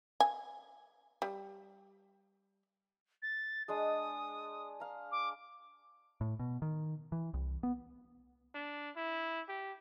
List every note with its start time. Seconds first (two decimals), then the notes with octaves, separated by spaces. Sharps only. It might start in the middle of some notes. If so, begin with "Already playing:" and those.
0.20 G#5
1.22 G3
3.22 A6
3.68 G#3 D4 G#4 D#6
4.80 F5 A#5
5.12 D6
6.21 A2
6.39 B2
6.62 D#3
7.12 E3
7.34 C2
7.63 B3
8.55 D4
8.97 E4
9.49 G4